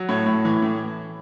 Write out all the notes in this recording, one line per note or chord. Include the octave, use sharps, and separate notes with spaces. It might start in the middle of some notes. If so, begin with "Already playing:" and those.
Already playing: F#3
A2 C#5
A2
E3
A2